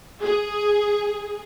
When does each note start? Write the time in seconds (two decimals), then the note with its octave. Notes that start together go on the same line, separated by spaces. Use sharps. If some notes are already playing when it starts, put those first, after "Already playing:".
0.21 G#4